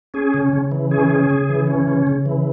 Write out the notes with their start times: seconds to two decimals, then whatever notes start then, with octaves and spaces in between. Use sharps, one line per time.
0.14 C#4 G#4
0.34 C#3
0.53 C#3
0.72 E3
0.91 C#4 G#4
1.10 C#3
1.30 C#3
1.49 E3
1.67 C#4
1.87 C#3
2.07 C#3
2.26 E3